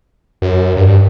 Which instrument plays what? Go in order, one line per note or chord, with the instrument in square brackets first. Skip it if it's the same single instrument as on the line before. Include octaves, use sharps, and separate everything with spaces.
[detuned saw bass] F#2
G2